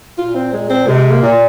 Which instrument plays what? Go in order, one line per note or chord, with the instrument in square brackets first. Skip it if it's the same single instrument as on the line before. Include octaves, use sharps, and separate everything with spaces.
[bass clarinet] A#2 [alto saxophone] F4
[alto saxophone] C4
G#3
C4
[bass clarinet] C3 [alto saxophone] G#3
[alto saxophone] A#3
[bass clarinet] A#2